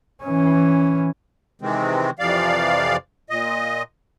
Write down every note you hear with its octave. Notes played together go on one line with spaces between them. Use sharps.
E3 C#4
C3 D#3 E3 G#3 C4
F2 C3 E3 F3 D5 F5
A#2 D#5